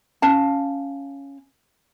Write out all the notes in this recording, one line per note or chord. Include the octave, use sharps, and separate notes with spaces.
C#4 F5 A5